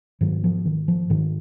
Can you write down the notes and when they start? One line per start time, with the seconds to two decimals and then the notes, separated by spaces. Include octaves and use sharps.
0.21 G#2 D#3 F#3
0.44 F3
0.65 D#3
0.88 F3
1.10 G#2 D#3